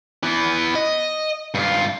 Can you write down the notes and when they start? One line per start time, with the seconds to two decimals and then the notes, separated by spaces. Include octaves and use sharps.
0.23 E3 B3
0.75 D#5
1.54 G2 F4